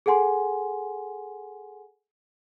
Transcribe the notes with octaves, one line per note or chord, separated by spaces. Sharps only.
G#4 A4 F#5 G#5 C6